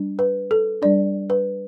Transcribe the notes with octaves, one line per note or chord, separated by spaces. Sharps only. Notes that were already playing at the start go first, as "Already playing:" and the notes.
Already playing: G3 D4
B4
A4
G3 D4 D5
B4